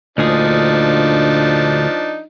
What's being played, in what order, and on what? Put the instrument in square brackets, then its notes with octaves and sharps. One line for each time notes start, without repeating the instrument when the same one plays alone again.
[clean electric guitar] D2 A#2 G#4 [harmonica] F3 D4 D#4